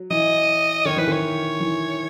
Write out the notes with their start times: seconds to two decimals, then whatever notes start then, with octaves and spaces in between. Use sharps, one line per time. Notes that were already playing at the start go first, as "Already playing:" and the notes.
Already playing: F#3
0.10 E3 D#5
0.85 D#3 C#5
0.97 E3 B4
1.07 D#3 C#5
1.60 E3